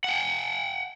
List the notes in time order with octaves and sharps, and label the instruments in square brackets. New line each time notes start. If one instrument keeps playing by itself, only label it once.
[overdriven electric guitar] F#5 G5